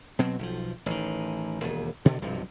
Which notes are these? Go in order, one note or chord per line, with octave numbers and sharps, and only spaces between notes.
B2 F#3 C4
B1 E3 F3
A1 D#3
E1 D#2
G2 B2 D3 D#3
B1 G2 C3 F3